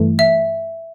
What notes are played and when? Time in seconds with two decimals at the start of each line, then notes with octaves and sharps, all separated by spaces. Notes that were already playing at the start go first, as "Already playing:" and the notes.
Already playing: G2 E3 A3
0.19 E5